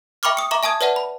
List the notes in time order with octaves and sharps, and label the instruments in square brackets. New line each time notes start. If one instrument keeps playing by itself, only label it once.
[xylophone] E5 G5 B5 C#6 D6 F6
D#6 C#7
E5 A#5 C#6 D6
E5 G#5 A5 D#6 G#6
B4 C#5 D5 E5 F#5 A5
B5